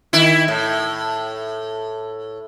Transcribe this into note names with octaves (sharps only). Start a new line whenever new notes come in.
D#3 E4
A2